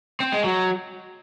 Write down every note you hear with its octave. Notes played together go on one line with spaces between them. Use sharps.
C4
G#3
F#3